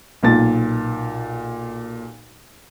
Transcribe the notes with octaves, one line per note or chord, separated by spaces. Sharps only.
B1 A#2 A6